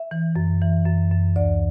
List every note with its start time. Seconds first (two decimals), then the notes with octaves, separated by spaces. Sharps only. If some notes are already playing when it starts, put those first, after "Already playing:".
Already playing: E5
0.11 E3
0.36 F#2
0.61 E3
0.86 F#2
1.11 F#2
1.36 D2 D5